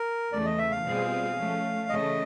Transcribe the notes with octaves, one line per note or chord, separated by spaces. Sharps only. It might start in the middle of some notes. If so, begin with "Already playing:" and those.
Already playing: A#4
E2 C#3 E3 A3 D5
D#5
E5
F5
B2 G3 C4 F4 G#4
F3 A3 C#4
C#3 E3 A3 D#5